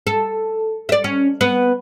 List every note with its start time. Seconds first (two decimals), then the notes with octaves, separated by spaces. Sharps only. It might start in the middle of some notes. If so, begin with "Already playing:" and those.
0.07 A4
0.89 D5 E5
1.04 C#4
1.41 B3